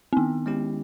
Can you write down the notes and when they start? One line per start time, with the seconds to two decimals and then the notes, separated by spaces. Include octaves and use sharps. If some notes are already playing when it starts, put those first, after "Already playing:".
0.13 C4
0.16 D#3 B3
0.46 G#3 C#4 E4 G4